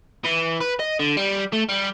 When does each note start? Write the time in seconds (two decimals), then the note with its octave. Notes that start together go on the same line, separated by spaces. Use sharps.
0.24 E3
0.60 B4
0.79 D#5
0.99 D3
1.17 G3
1.52 A3
1.69 G3